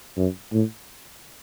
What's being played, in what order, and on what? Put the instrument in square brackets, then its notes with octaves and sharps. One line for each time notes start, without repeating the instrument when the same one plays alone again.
[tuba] F#2
A2